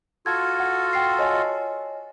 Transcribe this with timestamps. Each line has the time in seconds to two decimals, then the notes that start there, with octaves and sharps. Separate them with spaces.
0.26 F4 F#4 A4 G#6
0.60 F#5
0.93 G5 C7
1.19 C#5 D#5 G#5